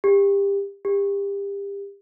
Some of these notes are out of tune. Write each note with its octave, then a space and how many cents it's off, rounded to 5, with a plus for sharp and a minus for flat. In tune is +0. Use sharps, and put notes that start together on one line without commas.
G4 +25
G4 +30